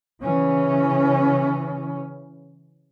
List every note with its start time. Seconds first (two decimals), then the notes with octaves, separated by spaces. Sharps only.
0.22 C#3 E3 C#4